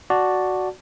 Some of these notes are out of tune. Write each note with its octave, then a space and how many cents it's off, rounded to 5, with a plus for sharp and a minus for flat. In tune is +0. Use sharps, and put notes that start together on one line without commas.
F#4 +0 D5 +0 A5 +0